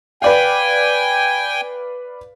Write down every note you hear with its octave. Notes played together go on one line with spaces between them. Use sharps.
B4 D5 F5 G5 G#5